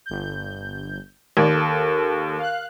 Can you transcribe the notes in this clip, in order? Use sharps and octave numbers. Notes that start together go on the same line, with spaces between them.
G1 G6
D#2 D5
A4
F5 F#6